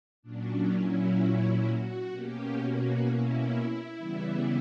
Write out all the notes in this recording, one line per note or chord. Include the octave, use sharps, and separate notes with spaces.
A#2 F#3 C#4 D4
E4
F#4
B2 A#3 C#4 G4
F#4
E4
C#3 E3 G3 B3